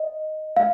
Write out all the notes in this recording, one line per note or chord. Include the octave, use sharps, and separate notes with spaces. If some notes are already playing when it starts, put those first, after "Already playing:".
Already playing: D#5
F5